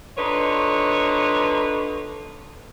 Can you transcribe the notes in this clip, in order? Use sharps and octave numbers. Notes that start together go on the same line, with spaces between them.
D3 D#4 F4 B4 C#5